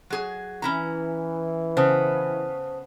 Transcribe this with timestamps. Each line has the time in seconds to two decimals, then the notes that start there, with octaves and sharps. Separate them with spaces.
0.10 F#3 G#4
0.62 E3 C#4 E4 A#5
1.77 C#3 B3 C5 A5 D#6